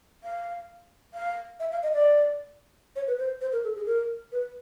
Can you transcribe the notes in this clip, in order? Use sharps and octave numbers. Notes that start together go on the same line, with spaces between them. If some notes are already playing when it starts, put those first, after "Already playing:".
F5
F5
E5
F5
D#5
D5
C#5
B4
C5
C5
A#4
A4
G#4
A#4
B4